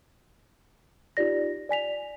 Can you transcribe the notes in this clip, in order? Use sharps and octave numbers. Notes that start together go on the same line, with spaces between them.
D#4 F4 G4 D5 A#6
D5 G#5 B6 F7